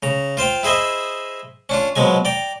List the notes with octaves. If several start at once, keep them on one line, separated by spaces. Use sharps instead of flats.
C#3 A#5
F4 C5 F5 G5
E4 G#4 C5 D#5 E5
C#4 D4 F4
B2 F3 F#3 G#3 G#5
D5 G5 A#5